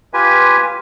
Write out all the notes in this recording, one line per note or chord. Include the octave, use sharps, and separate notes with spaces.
F4 G4 B4 G#5